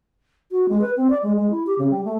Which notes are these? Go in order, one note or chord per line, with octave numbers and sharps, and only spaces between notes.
F#4
G#3
B4
C4
D5
G#3
G#3
E4
G4
C#3
G3
A3